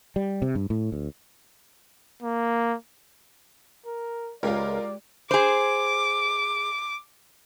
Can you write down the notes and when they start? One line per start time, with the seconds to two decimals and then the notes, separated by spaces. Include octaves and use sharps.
0.16 G3
0.42 C3
0.55 G2
0.70 A2
0.92 D2
2.23 A#3
3.86 A#4
4.43 C#2 G#3 F4 G4 A#4 D5
5.31 G#4 C5 D6